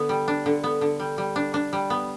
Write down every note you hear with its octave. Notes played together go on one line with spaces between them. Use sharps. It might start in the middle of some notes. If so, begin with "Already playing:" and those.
Already playing: D3 B3
G3
D4
D3
B3
D3
G3
G3
D4
D4
G3
B3